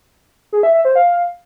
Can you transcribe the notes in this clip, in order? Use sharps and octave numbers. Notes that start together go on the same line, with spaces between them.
G#4
E5
E5
C5
F5